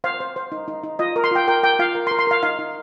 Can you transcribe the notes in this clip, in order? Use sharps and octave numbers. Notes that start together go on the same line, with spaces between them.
C5 F5
C5
C5
D#4
D#4
D#4
F4 D#5
A#4
C6
F4 G5
A#4 G5
A#4 G5
F4 F5
A#4
C6
A#4
C6
A#4 F5
D#4 F5
D#4